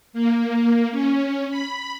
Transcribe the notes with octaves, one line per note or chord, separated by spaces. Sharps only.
A#3
C#4
B5